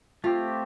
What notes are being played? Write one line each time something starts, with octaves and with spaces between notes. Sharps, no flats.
A3 C4 F4 G4